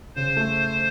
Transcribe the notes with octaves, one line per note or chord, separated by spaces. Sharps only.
C#3 C5
A3